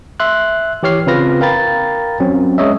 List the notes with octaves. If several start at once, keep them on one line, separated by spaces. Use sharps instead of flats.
E5 C6 F#6
E3 G4 C#5 F6 C7
C#3 C4 F4 B4 F6 A#6
A#4 F5 G5 A#5 B5 A6
F#3 C4 C#4
G#3 C#4 C#5 D#5 E5